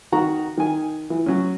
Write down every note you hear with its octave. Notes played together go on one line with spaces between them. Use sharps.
D#3 F#4 A#5
D#3 G#5
E3
F#3 C#4